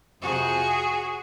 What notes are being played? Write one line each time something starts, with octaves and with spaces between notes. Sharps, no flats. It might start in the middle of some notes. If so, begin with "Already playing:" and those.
F2 C3 F3 F#4 G#4